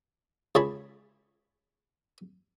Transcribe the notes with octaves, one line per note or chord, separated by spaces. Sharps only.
C#2 G#4 C#5 A5 B5